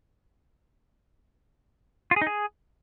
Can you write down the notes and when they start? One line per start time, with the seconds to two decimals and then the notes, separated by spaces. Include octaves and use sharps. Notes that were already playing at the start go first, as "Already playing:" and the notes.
2.11 F4
2.16 G#4
2.21 D#4
2.27 G#4